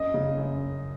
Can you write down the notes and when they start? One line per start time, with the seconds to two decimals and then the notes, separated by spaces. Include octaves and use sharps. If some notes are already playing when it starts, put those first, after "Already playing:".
Already playing: F#2 D#5
0.14 C#3
0.38 F#2